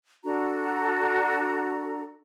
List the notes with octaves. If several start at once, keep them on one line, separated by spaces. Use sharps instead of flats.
D4 F#4 A4 A#5